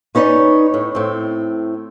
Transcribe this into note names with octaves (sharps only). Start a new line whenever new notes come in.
C#4 D#4 B4 C#5 D5
A2
A2 C4